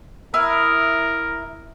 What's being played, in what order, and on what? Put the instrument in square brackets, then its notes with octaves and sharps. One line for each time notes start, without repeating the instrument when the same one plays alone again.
[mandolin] E4 F5 D#6 [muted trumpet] A#4